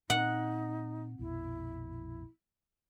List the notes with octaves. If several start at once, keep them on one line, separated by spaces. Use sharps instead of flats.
A#2 C4 D#4 F#5
A#1 F2 B2 E4